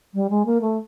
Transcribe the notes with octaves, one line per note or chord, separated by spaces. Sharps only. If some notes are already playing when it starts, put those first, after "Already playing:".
G3
G#3
A#3
A3